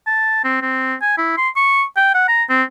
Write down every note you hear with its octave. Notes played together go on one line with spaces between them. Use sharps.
A5
C4
C4
G#5
E4
C6
C#6
G5
F#5
A#5
C4